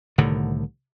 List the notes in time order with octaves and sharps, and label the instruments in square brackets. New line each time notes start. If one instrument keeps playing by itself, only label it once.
[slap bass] C2 A2 D3 D#3